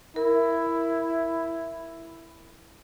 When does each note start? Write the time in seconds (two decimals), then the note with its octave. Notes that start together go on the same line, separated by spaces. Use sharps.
0.16 E4 A#4